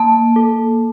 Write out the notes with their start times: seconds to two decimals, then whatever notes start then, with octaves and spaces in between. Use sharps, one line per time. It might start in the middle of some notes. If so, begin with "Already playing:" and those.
Already playing: A#3 A5
0.36 A4